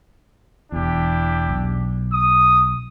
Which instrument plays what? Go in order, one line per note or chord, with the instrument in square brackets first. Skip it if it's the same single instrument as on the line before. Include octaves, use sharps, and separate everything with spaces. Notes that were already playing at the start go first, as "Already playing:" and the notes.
[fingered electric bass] E1 E2 [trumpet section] D4 E4 G4
[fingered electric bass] B1
[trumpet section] D#6